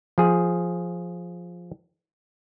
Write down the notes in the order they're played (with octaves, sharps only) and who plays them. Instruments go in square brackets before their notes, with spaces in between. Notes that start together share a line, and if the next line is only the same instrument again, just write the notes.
[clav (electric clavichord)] F3 G#4